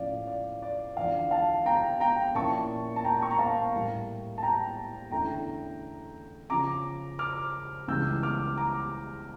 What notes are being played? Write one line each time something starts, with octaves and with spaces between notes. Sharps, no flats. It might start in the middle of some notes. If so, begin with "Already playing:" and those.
Already playing: A2 F3 C#4 E4 D5 F5
D5
D5
E2 D3 F3 D5 F5
F5 A5
G5 A#5
G5 A#5
A#2 F3 C#4 E4 A5 C#6
A5
G5 A#5
C#6
A#5
F5 A5
A2 G3 A#3 E4
A5
G5 A#5
E2 D3 A3 C#4 E4 G5 A#5
C#3 F3 C#4 A#5 D6
D6 F6
C#2 C#3 E3 G3 C#4 E6 G6
D6 F6
A#5 D6